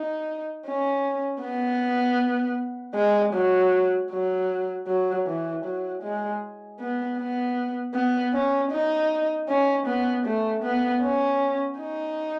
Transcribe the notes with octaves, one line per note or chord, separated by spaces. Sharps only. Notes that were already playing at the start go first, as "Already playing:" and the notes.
Already playing: D#4
C#4
B3
G#3
F#3
F#3
F#3
E3
F#3
G#3
B3
B3
B3
C#4
D#4
C#4
B3
A3
B3
C#4
D#4